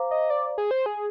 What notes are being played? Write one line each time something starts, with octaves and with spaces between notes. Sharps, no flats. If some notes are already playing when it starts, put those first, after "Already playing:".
Already playing: C5 F5 A#5 D6
D#5
D5
G#4
C5
G#4